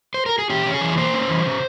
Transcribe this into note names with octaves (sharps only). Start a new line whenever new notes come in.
C5
A#4
G#4
C#4 G4
C#4
G#4
E3
A#3 C5
C#4
E3
C#3